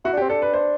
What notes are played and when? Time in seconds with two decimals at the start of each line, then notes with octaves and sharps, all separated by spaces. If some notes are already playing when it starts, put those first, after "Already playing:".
0.04 E4 F#4
0.13 D4
0.17 G4
0.21 C4
0.29 D4 A4
0.42 B4
0.54 C5